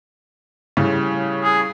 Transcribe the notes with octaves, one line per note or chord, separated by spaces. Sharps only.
A2 C#3 G3
G#4